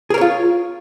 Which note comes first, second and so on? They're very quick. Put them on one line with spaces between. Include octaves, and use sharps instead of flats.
G#4 A#4 C#5 F4